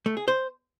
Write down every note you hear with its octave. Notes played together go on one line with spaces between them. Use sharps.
A3
G#4
C5